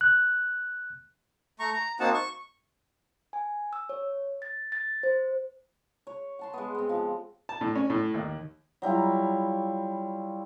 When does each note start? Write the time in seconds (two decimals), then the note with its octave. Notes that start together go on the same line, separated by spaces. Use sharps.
0.01 F#6
1.59 A3 A#5 C#6
1.73 A#5
2.00 A#3 C4 D#4 F#4 F#5 A5
2.14 C#6
3.33 G#5
3.73 E6
3.89 C#5
4.42 A6
4.72 A6
5.03 C5
6.07 C#5
6.39 F#5 A5 C6
6.54 G#3 B3
6.74 B3 C4
6.89 F3
7.49 A5
7.61 A2
7.76 C#4
7.90 A2
8.14 D#2
8.82 F#3 G3 E4 F4